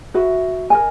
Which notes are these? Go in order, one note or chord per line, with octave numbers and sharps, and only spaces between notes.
F#4 B4 E5
A#4 D#5 G#5